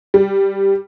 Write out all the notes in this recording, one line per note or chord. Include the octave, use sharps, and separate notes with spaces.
G3